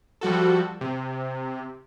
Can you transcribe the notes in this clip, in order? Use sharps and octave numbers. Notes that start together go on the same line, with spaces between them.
F3 G3 F#4 A4
C3